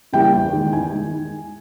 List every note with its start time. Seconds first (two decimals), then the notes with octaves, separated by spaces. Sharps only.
0.13 C#3 E3 G3 A#3 G5
0.33 E2
0.53 D#3 G#3
0.72 E2 G#5
0.92 D#3 G#3